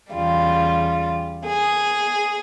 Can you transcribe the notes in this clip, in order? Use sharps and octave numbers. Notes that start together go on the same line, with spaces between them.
E2 C#3 G3 F4
G#4